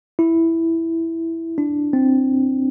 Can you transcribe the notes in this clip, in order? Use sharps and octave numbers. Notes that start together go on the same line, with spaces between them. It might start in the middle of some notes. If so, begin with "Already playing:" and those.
E4
D4
C4